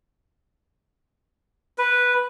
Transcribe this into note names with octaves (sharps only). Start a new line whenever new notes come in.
B4